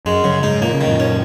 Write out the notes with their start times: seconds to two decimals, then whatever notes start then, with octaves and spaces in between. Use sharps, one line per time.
0.06 F#2 G#3
0.24 F#2 C#3
0.43 G#2 D#4
0.62 A#2 A#3
0.74 C#3
0.81 D#3
0.87 F#2 A#2
1.00 C#4